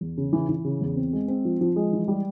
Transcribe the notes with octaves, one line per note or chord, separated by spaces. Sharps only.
E2
C#3
E3
E3
C#3
E2
C4
G#3
C4
F3
F3
G#3
E3
G3